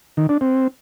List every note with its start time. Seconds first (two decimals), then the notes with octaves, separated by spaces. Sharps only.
0.17 D#3
0.29 D4
0.41 C4